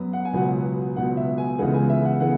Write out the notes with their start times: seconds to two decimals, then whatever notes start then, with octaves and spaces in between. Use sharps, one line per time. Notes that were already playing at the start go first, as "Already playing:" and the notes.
Already playing: F#2 F#3 B3
0.13 F#5
0.25 G#5
0.33 C#2 B2 F#3 B3 F#5
0.96 C#2 B2 F#3 B3 F#5
1.17 E5
1.38 G#5
1.59 C#2 C#3 E3 G#3 B3 F#5
1.74 G#5
1.89 E5
2.05 F#5
2.20 C#3 E3 G#3 B3 F#5